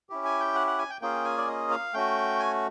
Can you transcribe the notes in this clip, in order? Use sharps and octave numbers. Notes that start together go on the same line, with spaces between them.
C#4 E4 G4
G#5
G5
F#5
F#5
G#5
G5
A#3 C#4 F4 G#4 G5
G#5
D5
D#5
F5
A3 C#4 F#4 G5
G#5